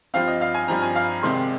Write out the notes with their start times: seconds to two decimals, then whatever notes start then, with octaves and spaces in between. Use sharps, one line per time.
0.14 G2 F3 C4 F5
0.27 D#5
0.41 F5
0.54 G#5
0.68 G2 F3 C4 A#5
0.82 G#5
0.96 F5
1.23 C2 C3 D#3 G#3 C4 C6